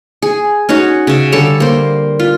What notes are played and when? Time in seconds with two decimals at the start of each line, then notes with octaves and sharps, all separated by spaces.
0.22 G#4
0.69 C#4 D#4 F#4 C#5
1.07 C#3 E5
1.32 D3 G3 A4 C#5
1.60 A#3 C5
2.19 F4